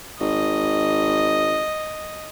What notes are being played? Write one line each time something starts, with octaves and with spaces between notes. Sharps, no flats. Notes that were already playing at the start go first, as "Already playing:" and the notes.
G#1 D#5